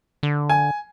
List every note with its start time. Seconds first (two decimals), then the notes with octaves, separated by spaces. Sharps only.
0.23 D3
0.49 G#5